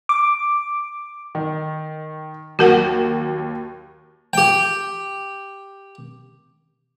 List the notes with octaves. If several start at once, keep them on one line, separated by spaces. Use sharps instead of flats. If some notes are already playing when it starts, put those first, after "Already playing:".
D6
D#3
D#2 F#3 F#4 A#4 F#5
G4 G5